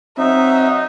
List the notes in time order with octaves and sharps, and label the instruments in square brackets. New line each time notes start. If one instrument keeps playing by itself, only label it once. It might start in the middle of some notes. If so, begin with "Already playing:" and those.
[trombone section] F#3 D#4 [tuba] C4 [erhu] E5